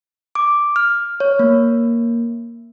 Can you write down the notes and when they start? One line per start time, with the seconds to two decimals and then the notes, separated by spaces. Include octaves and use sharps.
0.35 D6
0.76 F6
1.20 C#5
1.39 A#3